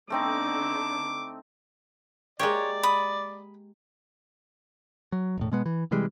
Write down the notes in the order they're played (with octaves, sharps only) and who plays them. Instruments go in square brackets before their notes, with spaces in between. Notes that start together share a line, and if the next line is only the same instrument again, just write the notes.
[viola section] D3 B3 D4 [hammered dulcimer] A3 C4 D#4 [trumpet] D6
[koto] G#3 A#3 G4 [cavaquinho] C#5 [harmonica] D5
[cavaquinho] B5 D#6
[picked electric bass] F#3
E1 A2
B2 G#3 B3
E3
C3 E3 G3 G#3